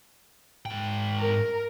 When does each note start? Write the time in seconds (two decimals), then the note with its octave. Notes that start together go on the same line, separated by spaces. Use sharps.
0.66 G#2 G5
1.18 A#4